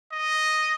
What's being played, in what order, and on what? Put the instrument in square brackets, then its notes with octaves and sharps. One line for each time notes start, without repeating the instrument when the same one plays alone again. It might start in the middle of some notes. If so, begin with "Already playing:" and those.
[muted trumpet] D#5